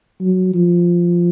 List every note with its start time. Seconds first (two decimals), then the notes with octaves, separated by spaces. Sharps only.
0.21 F#3
0.54 F3